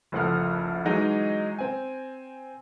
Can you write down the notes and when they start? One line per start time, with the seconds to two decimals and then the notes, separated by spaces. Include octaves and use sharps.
0.12 F#1 D2 F3 A4 F#5 F6
0.85 E3 F#3 G#3 D#4 F#4
1.59 C4 G#5